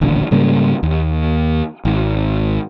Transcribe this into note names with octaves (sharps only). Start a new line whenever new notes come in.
D#1 A1 D3
G#2 C#3 G3 A#3
D#2
G#1